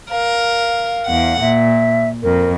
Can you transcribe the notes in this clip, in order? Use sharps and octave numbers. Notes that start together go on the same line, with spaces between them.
A#4 F5
E2 F#5
A#2 E5
F2 A#4